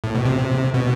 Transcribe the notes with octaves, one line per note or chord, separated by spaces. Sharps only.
A2
B2
C3
B2